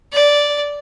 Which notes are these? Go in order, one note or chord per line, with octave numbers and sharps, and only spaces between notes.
D5